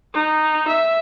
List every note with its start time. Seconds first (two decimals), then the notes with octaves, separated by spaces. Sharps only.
0.14 D#4
0.68 E5